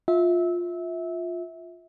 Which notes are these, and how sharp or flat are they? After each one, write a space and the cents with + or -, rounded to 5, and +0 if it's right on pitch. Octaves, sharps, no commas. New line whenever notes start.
F4 +10 E5 -20